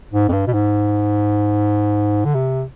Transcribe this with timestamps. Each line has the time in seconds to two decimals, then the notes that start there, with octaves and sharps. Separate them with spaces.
0.13 G#2
0.29 F2
0.33 G2
0.48 B2
0.53 G#2
2.25 D3
2.35 C3